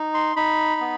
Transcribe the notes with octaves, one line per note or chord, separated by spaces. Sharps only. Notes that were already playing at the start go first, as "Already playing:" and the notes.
Already playing: D#4
C6
D#4 B5
B3